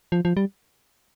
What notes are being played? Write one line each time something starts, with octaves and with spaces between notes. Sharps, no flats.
F3
F3
G3